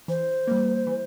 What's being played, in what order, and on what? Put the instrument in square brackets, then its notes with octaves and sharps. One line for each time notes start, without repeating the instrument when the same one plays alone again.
[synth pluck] E3 [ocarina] C5
[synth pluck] G3 A#3
E3